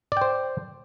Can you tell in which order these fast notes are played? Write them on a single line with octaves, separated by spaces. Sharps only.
D5 G5 C5